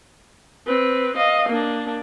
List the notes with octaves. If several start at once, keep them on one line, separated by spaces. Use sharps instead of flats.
C4 B4
D#5 F5
A#3 D4